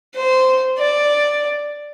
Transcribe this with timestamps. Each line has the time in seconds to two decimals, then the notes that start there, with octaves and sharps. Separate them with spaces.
0.14 C5
0.79 D5